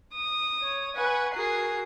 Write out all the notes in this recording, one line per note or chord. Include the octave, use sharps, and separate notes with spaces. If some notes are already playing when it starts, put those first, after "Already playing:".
D#6
C#5
B4 F#5 G#5 C#6
F#4 G#4 A#4 C7